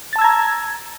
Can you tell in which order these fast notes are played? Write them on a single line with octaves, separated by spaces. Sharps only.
A6 A5 E6 G#6 A#5